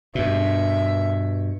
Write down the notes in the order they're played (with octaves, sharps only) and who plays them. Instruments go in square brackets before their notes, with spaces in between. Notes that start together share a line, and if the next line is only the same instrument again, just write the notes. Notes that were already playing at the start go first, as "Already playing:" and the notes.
[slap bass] G2 B2 [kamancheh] E5